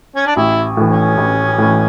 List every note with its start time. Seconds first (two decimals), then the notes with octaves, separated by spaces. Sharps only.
0.16 C#4
0.26 D4
0.36 A1 E4
0.77 A2 E3
0.90 C#4
1.17 A1
1.58 A2 E3